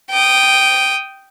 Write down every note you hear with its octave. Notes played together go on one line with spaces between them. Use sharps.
G5 D#6